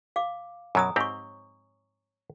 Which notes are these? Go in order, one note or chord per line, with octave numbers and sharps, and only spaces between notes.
F5 D6
F#2 B2 F#3 G#5 A#5 D#6
G#2 C4 G4 C#5 C#6